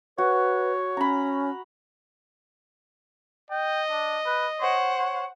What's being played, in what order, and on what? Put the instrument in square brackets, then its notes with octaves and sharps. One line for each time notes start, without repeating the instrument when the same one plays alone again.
[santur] F#4 [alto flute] B4 [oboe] C#5
[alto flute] C#4 [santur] A#5 B5
[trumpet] D#5 [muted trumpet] G5
[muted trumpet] D4
B4
[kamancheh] C5 F#5 [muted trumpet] C#5
[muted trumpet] C#5